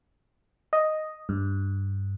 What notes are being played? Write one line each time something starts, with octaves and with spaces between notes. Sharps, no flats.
D#5
G2